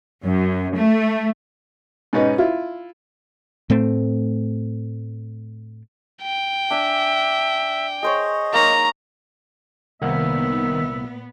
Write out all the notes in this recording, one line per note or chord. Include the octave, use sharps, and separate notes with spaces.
F#2
A3
G#2 B2 C#4 D#4 B4
E4 F4
A2 A3 C4
G5
D4 E5 G#5
G#4 C5 C#5 D#5
A#3 D#4 C#5 A#5
C2 A#2 D#3 A#3 B3 E5 F#5